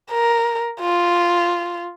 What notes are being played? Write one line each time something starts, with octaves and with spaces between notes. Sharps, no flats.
A#4
F4